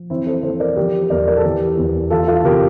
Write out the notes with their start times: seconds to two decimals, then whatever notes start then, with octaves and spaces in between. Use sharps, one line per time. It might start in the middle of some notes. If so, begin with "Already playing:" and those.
Already playing: F3
0.10 E3 C4 E4
0.26 A4 C5
0.43 E3 A4 C5
0.60 A#4 D5
0.76 F3 G4 A#4
1.10 E2 A#4 D5
1.27 A#4 D5
1.37 A4
1.44 E3 G4 A#4
1.77 E2
2.10 E3 F4 A4
2.28 F4 A4
2.44 C3 G4 A#4